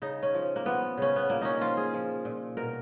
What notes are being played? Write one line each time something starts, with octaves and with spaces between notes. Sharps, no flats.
C#3 D#4
C#4
F3
A#3
F3 B3
C#3 C#4
B3
A#2 A#3
C#4 D#4
F3 F4
G#4
F3
A#2
B2 A#4